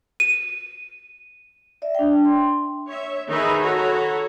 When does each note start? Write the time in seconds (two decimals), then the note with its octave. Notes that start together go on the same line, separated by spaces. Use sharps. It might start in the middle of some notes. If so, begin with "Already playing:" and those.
0.20 D#7
1.82 D5 E5
1.95 D4 G5
2.25 C6
2.89 C#5 E5
3.29 D#3 D#4 G#4 B4 E5 B5
3.63 F#4 A4 C#5 A#5 B5